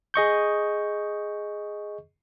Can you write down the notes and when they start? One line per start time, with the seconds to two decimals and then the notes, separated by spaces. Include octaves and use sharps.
0.14 G#4 D#5 C#6 G6